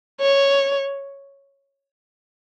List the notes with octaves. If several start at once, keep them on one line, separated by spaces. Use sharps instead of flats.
C#5